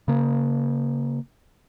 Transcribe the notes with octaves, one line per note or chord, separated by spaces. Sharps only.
C#3 A#3